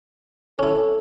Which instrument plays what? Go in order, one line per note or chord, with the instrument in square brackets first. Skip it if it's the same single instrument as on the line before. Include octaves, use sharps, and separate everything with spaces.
[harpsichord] C#4 E4 [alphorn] A4